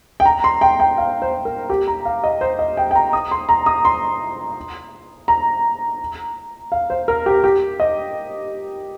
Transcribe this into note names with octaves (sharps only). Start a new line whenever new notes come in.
G5
A#5
C6
G5
G5
F5
C5
A#4
G4
A#5
F5
D#5
C5
D#5
G5
G5
A#5
D#6
C6
A#5
D#6
C6
A#5
F5
C5
A#4
G4
G4
D#5